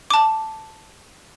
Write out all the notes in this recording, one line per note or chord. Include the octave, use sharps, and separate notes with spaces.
A5 D6